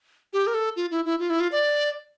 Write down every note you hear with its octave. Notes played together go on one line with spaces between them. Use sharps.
G4
A#4
A4
F4
E4
E4
F4
E4
F4
D5